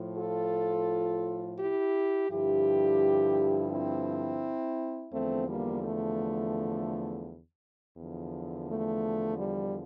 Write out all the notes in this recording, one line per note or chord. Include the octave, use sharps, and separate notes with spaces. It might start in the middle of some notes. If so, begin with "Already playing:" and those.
Already playing: A2 F3
F4 A4
E4 G4
G2 D3 F3 E4 G4
C4 E4
E2 D3 F3 A3 C4
G3 A#3
A3
E2 D3 F3
A3
G3